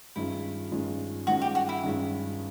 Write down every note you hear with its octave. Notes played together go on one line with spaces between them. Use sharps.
G2 D#3 G#3 C#4 E4 F4
G2 D#3 G#3 C#4 F4
G2 D#3 G#3 C#4 F4 F#4
G4
F#4
E4
G2 D#3 G#3 C#4 F4